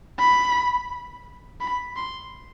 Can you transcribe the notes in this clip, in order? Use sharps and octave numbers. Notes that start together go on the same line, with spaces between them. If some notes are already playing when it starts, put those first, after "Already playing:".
B5
B5
C6